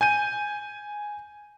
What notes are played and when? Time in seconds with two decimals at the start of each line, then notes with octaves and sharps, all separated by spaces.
0.01 G#5 G6 D#7